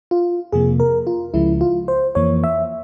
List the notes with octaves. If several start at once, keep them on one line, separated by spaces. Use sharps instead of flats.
F4
F2 C3 F3 A#3 G#4
A#4
F4
C#2 C#3 F3 G#3 E4
F4
C5
F2 E3 A#3 C#5
E5